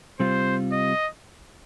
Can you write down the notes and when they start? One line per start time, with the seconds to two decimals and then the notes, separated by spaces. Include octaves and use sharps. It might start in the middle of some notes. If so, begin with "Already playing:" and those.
0.20 C3 G3 C4 F4 C5
0.72 D#5